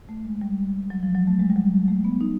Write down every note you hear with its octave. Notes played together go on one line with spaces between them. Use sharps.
A3
G#3
G3
F#3
F3
F#3
A3
G#3
G3
F#3
A3
B3
D#4